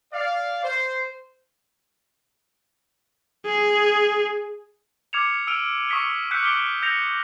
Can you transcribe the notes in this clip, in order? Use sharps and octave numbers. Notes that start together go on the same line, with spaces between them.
D5 F5
C5
G#4
D6 F6 G#6 C#7 E7 F7
E6 F6 D7 D#7 F7 G7
C#6 D#6 B6 C#7 G7
E6 F#6 G6 B6 C#7 E7
D6 F6 G6 B6 D7 G7
E6 G6 A#6 C#7 F7